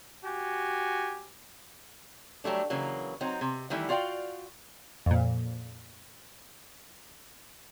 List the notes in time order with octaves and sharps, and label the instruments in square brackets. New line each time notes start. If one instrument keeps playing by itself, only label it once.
[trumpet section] F#4 G4 G#5
[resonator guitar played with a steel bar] F#3 G3 A3 D4
C#3 E3 F#3 A#3
F#3 C4 D#4
C3
D#3 E3 G3 A3 E4
F4 F#4 D5 F5 G5
[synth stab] F2 A#2